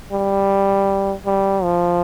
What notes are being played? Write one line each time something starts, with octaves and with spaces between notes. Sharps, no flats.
G3
G3
F3